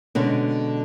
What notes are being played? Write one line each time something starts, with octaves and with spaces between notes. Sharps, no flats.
B2 D3 G#3 C#4